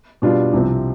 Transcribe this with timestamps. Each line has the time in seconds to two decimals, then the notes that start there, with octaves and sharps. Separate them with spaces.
0.22 B2 G3 D4 F4
0.53 C2 C3 F3 C4